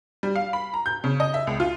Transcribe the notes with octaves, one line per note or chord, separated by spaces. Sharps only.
G3
F5
B5
A#5
G6
C#3
D#5
E5
C#2
F4